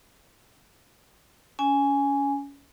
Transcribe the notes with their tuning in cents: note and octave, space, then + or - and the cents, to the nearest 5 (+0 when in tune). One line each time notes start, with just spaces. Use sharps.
C#4 +25 G#5 +0